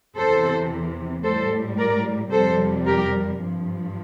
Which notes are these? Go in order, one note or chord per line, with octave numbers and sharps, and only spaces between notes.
E2 C3 E3 A4 C5
A2 G3 A4 C5
A#4 D5
F2 C3 G3 A4 C5
G4 A#4
G2 F3